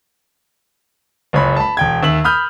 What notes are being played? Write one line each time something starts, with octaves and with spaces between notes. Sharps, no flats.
F#1 C#2 C#5 B5
A5 B5
E1 G5 G#6
D#2 E5 E6 F#7
B5 D#6 F6 G6